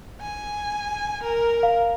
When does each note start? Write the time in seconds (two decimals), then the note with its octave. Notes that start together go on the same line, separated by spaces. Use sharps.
0.21 G#5
1.23 A#4
1.63 F5